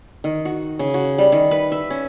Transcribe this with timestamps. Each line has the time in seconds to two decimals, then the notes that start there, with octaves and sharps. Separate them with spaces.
0.24 D#3
0.45 F#4
0.79 C#3
0.94 F#4
1.18 G3
1.32 D#3
1.51 B4
1.72 E5
1.90 C#4